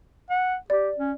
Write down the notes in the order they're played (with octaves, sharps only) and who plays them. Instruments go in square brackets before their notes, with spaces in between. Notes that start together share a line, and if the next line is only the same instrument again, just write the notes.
[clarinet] F#5
[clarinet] G4 [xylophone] D5
[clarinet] C#4